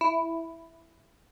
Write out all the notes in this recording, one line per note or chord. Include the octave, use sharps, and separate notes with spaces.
E4